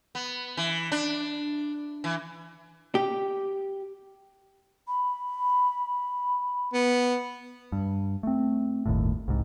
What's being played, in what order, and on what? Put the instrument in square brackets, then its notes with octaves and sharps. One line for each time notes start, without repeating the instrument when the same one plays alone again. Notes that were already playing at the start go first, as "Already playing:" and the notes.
[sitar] B3
E3
D4
E3
[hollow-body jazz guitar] G4
[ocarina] B5
[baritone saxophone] B3
[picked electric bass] G2
A3 C4
G1 D#2 A2
C2 G#2